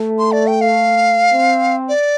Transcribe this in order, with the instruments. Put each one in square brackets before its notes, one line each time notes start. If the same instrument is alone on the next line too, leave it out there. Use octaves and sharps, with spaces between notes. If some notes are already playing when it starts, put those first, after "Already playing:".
Already playing: [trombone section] A3
[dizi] C6
D5
G5
F5
[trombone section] C4
[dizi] D5